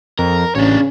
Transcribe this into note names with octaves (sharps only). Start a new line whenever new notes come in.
F2 A#4
A1 C#3 D4 C#5